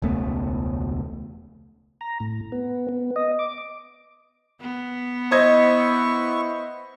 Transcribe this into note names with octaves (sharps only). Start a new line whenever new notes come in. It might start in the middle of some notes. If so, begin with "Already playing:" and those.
E1 C#2 A3 B3
A#5
A2
B3
B3
D#5
D6
B3
E4 C5 D#5 C#6 G#6